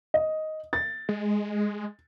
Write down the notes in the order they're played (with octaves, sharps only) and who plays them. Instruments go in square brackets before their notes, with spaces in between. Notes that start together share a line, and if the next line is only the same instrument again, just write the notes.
[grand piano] D#5
A6
[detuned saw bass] G#3